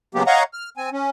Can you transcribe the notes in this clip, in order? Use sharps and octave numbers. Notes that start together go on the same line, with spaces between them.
C#3 F#3 G#3 A#3 B3 G4
C#5 D#5 F5 F#5 A#5 C#6
F6
C4 G#5
C#4